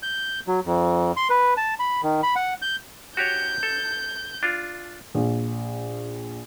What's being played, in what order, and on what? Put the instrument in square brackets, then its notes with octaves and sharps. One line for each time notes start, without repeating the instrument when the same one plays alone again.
[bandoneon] G6
F#3
F2
C6
B4
A5
B5
D#3
B5
F#5
G6
[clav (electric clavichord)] F#4 G4 C#5 [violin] G6
[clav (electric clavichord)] A4
D4 F4
[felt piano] A#1